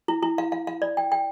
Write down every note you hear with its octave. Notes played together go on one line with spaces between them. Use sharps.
E4
E4
F5
F5
F5
D5
G5
G5